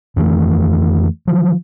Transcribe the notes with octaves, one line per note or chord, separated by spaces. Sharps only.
F2 D#3 E3 A3
D#3 F3 F#3